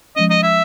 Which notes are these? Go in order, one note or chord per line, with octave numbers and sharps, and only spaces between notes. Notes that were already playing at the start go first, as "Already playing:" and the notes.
F3 G#3 C#4 D#5
D#5
E5